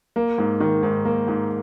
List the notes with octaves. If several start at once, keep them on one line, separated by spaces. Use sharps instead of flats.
A#3
G#2
D#3
G#2
A#3
G#2